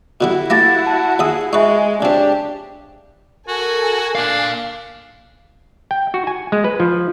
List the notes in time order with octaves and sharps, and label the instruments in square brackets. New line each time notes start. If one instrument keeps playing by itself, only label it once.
[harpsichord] B2 D3 G3 [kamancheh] E4 F#4
[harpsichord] A3 A#3 G4 [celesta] A6 A#6
[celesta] A5
[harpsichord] D#2 E5 D#6 [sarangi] G#4
[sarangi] G#3 [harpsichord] D#4 B4 [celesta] E5 C#6
[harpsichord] C#3 C4 [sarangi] D4 [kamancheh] G4
[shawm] F#4 [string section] A4 G#5 [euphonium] A#4
[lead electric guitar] A#2 F5 [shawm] D4
[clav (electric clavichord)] G5
F#4
G#5
G#3
B4
F3